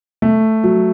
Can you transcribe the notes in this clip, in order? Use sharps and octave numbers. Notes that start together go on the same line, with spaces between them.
A3
F#3